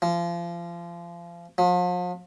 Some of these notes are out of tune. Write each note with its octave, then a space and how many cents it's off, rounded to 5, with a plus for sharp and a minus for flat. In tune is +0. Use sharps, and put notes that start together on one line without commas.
F3 -30
F3 +40